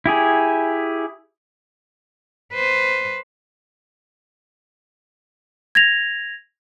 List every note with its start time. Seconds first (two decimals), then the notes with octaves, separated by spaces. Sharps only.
0.06 E4 G4 G#4
2.54 B4 C5
5.75 G#6 A#6 F7